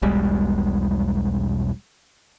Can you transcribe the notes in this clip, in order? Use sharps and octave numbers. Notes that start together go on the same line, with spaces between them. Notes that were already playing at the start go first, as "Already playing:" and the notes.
E1 B1 G3 G#3